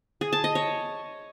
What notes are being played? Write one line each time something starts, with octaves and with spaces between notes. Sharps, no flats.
G#4
A5
D#5
C#5